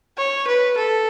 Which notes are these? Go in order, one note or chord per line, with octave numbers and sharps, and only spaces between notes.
C#5
B4
A4